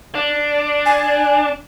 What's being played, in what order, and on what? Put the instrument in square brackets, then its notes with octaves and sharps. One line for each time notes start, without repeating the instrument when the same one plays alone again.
[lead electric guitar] D4
[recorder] G#5